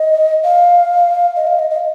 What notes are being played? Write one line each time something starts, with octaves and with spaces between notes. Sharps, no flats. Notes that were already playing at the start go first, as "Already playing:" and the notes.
Already playing: D#5
F5
D#5
F5
D#5
D#5